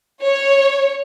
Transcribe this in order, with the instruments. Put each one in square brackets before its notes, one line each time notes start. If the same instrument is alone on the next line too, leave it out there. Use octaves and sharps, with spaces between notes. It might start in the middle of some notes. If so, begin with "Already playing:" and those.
[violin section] C#5